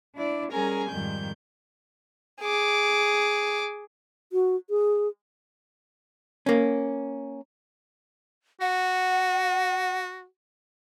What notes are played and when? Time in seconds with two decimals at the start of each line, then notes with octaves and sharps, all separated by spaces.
0.16 D4 E4 D5
0.52 G3 C#4 G#4 A#4 G#5 A#5
0.89 F2 G#2 D#3 G3 G6
2.41 G#4 D6
4.33 F#4
4.70 G#4
6.46 A#3 C#4
8.61 F#4 F#5